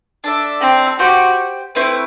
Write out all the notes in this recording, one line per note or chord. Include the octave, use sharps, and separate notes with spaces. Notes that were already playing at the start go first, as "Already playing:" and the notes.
D4 A4 E5
C4
F#4 G4 C5 G5
A3 C4 E4 B4